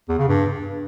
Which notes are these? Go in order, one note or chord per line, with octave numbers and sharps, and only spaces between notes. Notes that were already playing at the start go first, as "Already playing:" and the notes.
E2
C#3
G2